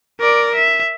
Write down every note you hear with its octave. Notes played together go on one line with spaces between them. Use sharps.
A#4 D5
E5